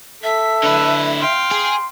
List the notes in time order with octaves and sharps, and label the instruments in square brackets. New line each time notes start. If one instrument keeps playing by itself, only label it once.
[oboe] A4 [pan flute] E5 [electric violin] B6
[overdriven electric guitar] D3 E4 [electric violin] B4
[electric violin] F5 G5 [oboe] C6
[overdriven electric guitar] G#4